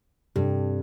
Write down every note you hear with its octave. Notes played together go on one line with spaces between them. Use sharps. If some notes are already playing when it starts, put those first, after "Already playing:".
G2 C3 G4 A4